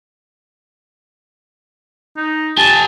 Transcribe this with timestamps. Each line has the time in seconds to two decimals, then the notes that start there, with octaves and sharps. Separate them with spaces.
2.16 D#4
2.58 G4 G#5 A5